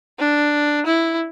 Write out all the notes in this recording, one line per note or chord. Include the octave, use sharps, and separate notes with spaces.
D4
E4